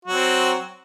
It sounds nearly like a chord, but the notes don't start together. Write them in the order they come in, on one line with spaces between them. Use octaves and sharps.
F#4 F#3 C4